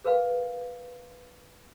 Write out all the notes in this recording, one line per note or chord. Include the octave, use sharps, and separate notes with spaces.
G#4 A#4 B4 F5 G5